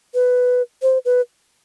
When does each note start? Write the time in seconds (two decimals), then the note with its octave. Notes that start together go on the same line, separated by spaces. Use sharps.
0.14 B4
0.82 C5
1.05 B4